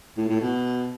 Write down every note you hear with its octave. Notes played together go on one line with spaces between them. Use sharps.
A2
A2
B2